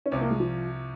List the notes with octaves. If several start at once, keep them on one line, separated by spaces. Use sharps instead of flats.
C#4
C2 C3 F3 C4
A#3
G#3
F3